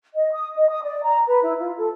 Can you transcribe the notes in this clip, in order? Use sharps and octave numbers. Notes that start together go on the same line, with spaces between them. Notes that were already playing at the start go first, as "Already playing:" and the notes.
D#5
D#6
D#5
D#6
D5
A#5
B4
E4
F4
A4